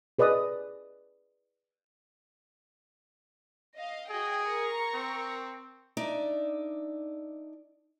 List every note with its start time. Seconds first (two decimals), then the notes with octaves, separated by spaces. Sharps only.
0.19 G#4 B4 D5 D#5 D#6
3.77 D#5 F5
4.09 F#4 G#4 D#5 G5
4.46 A#4 A#5 C#6
4.94 C4
5.97 D4 D#4 D5 E5